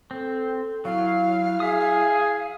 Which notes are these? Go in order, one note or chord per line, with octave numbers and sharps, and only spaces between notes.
C4 A4
F#3 E4 F5
G#4 E5 D#6